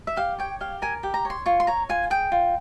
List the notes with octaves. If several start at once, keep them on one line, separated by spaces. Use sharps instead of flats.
E5
G4 F5
C#5 G5
G4 F5
A#4 G#5
G4
A#5
C#5
C6
F4 C#6
C6
C#5 A#5
F4 G#5
G#4 G5
F4